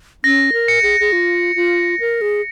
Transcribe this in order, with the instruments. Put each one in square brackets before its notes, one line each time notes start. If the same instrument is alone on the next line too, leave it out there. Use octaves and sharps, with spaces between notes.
[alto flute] C#4 [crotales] A#6
[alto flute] A#4
[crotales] C#7
[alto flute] G#4
G#4
F4
F4
A#4
G#4